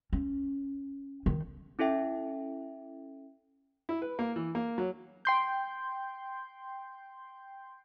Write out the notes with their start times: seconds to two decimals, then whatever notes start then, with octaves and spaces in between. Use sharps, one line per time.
0.13 C#4
1.26 D#3
1.79 C#4 E4 A4 E5 G5
3.89 E4
4.02 B4
4.19 A#3
4.36 E3
4.55 A#3
4.78 F#3
5.25 G5 C6 G6